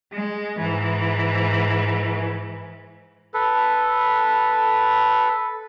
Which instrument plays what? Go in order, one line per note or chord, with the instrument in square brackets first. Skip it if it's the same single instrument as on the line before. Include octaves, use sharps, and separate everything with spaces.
[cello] G#3
G#2 E3
[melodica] A4 B4